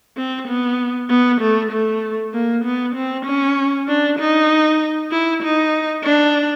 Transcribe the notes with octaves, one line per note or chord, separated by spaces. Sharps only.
C4
B3
B3
A3
A3
A#3
B3
C4
C#4
D4
D#4
E4
D#4
D4